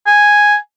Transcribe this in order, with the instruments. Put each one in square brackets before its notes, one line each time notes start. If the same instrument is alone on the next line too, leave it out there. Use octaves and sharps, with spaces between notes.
[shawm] G#5